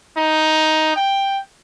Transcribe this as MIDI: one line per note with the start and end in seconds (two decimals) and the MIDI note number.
0.17 0.91 63
0.96 1.39 79